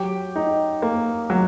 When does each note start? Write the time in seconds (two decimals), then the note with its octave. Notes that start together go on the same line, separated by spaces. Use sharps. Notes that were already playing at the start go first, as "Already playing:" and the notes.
Already playing: F#3 G4 G5
0.36 D#4
0.82 A#3
1.30 F#3